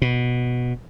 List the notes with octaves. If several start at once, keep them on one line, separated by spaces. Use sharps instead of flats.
B2